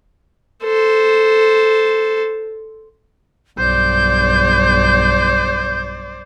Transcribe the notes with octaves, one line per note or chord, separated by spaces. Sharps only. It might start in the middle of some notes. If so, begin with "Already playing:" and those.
A4 C5
B1 G2 C5 D5 G6